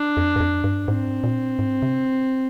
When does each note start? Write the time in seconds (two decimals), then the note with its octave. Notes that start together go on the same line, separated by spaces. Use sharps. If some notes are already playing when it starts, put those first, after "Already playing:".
Already playing: D4
0.17 F2
0.36 G2
0.40 F2
0.64 G2
0.88 G#2 C4
1.24 A#2
1.59 G#2
1.82 C3